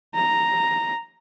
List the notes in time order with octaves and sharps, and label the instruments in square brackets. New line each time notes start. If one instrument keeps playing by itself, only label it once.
[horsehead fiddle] A#5